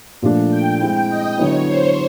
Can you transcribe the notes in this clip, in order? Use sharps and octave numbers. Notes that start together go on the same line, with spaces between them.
A#2 F3 A3 D4
G5
G#3 C4 E4
D#5
D3 F#3 B3 E4 C#5
C5